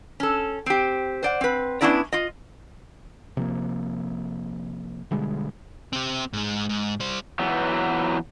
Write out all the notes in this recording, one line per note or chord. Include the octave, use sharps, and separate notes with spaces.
C#4 A4
C4 G4
C5 D5 F#5
C4 B4
B3 C#4 D4 E4 B4 D5
F4 D#5
C3 F3 A#3
B2 D3 G3 G#3
C4 G4
G#2 G#3
G#2
G3 C5
E3 F#3 B3